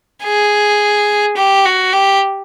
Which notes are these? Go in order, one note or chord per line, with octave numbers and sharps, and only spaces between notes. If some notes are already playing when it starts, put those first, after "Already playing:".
G#4
G4
F#4
G4